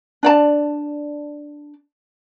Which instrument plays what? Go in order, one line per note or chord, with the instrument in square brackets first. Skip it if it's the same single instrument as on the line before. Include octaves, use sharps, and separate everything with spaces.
[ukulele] D4 D5 A5